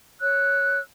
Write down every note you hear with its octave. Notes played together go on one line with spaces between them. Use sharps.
C#5 E6 F#6